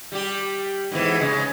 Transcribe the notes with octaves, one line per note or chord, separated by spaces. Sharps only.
G3 G4
G#2 B2 E3
C#3 G#3